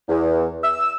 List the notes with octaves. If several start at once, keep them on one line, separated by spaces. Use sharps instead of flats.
E2
E6